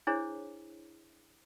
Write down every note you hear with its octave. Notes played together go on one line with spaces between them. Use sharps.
D4 E4 G#4 C5 C#5